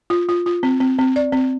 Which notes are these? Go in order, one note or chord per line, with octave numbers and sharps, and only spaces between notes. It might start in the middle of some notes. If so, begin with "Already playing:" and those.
F4
F4
F4
C4
C4
C4
D5
C4